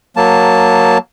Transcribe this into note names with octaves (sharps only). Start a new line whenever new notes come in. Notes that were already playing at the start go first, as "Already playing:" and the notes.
F#3 A#3 A5